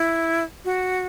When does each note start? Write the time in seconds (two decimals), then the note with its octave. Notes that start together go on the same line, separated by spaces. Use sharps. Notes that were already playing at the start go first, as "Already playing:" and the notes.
Already playing: E4
0.65 F#4